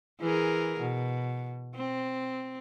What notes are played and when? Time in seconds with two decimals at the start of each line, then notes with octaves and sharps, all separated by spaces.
0.20 E3 G#4 A#4
0.80 B2
1.75 C4